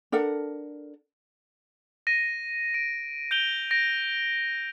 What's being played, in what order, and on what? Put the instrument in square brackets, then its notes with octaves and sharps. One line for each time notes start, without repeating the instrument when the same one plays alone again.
[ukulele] D4 A4 A#4 F#5
[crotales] A#6 D#7
D7
G6 D7 F7 G7
A#6 D7